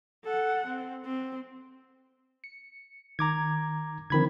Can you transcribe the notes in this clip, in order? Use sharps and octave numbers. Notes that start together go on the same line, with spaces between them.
A4 F#5
C4
C4
C#7
D#3 A#5 D6 G#6
D3 D#3 F3 C4 B5 G#6